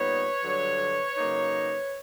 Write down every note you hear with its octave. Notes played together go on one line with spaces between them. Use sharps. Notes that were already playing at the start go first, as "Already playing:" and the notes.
Already playing: A#2 G3 B3 D#4 B4 C#5
G2 D3 F#3
C#3 F#3 A#3 D#4